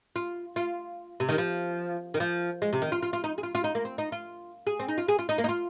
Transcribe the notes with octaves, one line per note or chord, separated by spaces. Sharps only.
F4
F4
C3
D#3
F3
D#3
F3
G#3
C3
D#3
F4
F4
F4
D#4
G#4
F4
F4
D#4
A#3
C4
D#4
F4
G#4
C4
D#4
F4
G#4
F4
D#4
A#3
D#4
F4